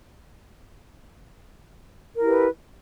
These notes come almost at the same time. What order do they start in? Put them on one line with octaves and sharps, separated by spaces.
A#4 E4 G4 B4